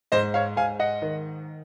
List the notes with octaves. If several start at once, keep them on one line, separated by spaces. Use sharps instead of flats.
G#2 C5 D#5
C#5 F5
G#2 F5 G#5
D#5 F#5
D#3